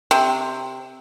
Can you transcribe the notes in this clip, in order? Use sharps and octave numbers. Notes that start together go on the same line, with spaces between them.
C3